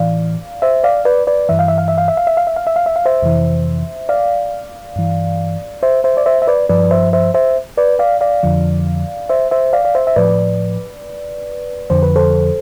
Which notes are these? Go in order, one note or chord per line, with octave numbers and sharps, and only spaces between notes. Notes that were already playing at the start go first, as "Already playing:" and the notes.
Already playing: A2 E3 D5 F5
C5 E5
D5 F5
B4 D5
B4 D5
G2 E3 E5
F5
E5
F5
E5
F5
E5
F5
E5
F5
E5
F5
E5
F5
E5
F5
C5 E5
F2 C3 E3
D5 F5
G2 E3
C5 E5
C5 E5
D5
C5 E5
E5
B4 D5
G2 F3 B4 D5
C5 E5
C5 E5
C5 E5
B4 D5
D5 F5
D5 F5
F2 D3 F3
C5 E5
C5 E5
D5 F5
D5
C5 E5
E5
A2 F3 B4 D5
F2 D3 F3 C5
B4
A4 C5